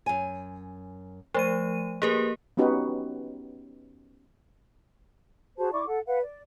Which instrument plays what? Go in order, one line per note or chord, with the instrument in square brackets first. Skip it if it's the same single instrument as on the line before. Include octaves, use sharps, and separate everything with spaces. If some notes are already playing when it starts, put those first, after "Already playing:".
[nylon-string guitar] F#2 G#5
[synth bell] F3 A3 D#7 [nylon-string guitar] C5
[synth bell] A#3 G4 A#4 [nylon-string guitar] G#4 B4
[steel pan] B3 C#4 D#4 F#4 G4 B4
[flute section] F#4 G#4 C5 A5
E4 D5 C#6 D6
A4 F#5
B4 F5 F#5
D5